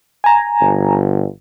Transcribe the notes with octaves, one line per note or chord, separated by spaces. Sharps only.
G#5 A#5
G1